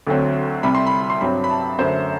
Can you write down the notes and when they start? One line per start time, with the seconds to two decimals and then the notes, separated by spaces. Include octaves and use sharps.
0.07 D2 D3 F#3 C4
0.63 C2 C3 G3 B5
0.75 C6
0.87 B5
1.10 C6
1.21 G2 F#3 C4 B5
1.44 B5
1.50 A5
1.79 F#2 D3 A3 C5